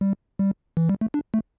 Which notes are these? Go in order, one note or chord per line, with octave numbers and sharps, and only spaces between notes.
G3
G3
E3
G3
A3
D4
A3